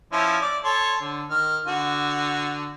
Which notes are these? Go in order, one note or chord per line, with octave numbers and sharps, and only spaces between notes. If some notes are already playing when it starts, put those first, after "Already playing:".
F3 C#4 E4
D5
A4 C#5 C6
D3
D#3 F6
D3 F#4